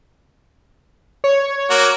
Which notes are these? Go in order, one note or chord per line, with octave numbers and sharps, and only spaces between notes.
C#5
A#3 F#4